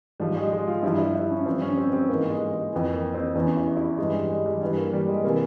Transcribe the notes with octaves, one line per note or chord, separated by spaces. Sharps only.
G#2 F3 G3
G#3
G#3
F4
G2 F3 E4
E4
E4
C#4
G2 F3 C4
C#4
C4
C4
G#2 E3 A#3
G#3
G#3
F2 E3
A#3
C4
E2 E3 C#4
E4
E4
G2 E3 G#3
G3
G#3
G3
G2 E3
A#3
G3
G#3
C3 E3 A#3